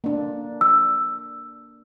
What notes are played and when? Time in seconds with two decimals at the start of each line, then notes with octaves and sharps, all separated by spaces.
0.04 A#3 D4
0.61 E6